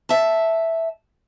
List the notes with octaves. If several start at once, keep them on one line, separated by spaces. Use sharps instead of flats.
E5 A5